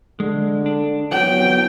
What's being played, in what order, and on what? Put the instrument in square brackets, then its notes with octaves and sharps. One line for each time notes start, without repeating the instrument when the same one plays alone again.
[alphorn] D3 [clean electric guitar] G#3
[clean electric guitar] D4
[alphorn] F#3 [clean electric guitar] B3 F#5 [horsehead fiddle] G5